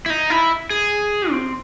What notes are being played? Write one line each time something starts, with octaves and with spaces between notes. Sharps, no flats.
E4
D#4
E4
G#4
C4